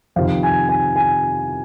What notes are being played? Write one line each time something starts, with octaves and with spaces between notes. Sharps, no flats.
F2 C3 D#3 F5
G#5
G#5
G#5